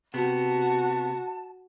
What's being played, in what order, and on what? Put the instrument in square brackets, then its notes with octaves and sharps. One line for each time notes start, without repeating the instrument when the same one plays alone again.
[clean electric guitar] C3 B3 [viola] F#4 [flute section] A5